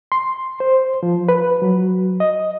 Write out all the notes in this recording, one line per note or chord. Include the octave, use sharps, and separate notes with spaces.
C6
C5
F3
B4
F#3
D#5